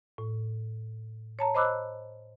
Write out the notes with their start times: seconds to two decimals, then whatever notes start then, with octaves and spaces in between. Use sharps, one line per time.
0.18 A2
1.39 C#5 A5 A#5
1.54 C5 D#5 B5 D6 E6 F#6